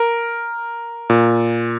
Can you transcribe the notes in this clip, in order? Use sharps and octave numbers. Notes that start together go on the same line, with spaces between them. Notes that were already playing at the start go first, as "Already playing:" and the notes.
Already playing: A#4
A#2